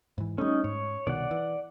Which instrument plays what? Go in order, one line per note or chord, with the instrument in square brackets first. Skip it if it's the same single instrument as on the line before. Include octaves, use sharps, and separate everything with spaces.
[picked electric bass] G#2 E3
[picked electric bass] G3 A3 [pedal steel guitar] C#4 D#4
[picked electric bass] G#2 [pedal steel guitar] C#5
[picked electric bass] C2 B2 D#3 [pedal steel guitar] D5 F#5
[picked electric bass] E3